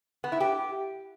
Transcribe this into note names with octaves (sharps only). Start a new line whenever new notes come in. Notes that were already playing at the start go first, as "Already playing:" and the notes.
B3
E4
G4